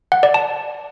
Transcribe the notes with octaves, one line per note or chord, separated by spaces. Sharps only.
F#5
D5
A5